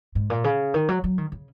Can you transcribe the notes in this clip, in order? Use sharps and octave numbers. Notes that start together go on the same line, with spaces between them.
G#2
A#2
C#3
D#3
F#3
F#3
D#3
C#3